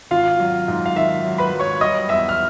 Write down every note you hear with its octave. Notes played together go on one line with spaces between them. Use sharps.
G#1 F4 F5
F#3
G#2
F5
D#3 E5
F#3
B4 B5
F#3
C#5 C#6
G3 D#5 D#6
E2 E5 E6
F6